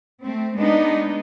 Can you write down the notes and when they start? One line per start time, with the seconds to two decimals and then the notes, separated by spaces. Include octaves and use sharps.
0.23 A3 C4
0.58 G#3 B3 D4 D#4